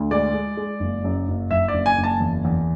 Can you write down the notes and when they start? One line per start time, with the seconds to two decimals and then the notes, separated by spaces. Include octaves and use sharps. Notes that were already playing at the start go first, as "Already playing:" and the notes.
Already playing: D2
0.11 G#3 D5
0.34 G#3
0.57 G#3
0.80 F#1
1.04 F#2
1.28 F#1
1.51 F#1 E5
1.68 D5
1.74 F#1
1.86 G#5
1.97 F#1
2.04 A5
2.20 E2
2.45 E2